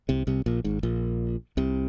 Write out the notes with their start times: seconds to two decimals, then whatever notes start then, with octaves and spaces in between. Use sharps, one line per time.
0.09 C2 C3
0.27 C2 C3
0.46 A#1 A#2
0.64 G#1 G#2
0.83 A#1 A#2
1.57 C2 C3